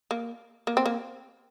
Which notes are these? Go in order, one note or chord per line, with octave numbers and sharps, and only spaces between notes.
A#3
A#3
C4
A#3